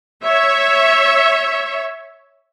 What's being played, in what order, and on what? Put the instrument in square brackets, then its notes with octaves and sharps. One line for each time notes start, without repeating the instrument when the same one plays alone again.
[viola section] C#5 E5